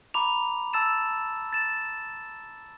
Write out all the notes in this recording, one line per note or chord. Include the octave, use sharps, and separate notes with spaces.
A#5 B5 D6 F7
A5 E6 A6 E7
A6 E7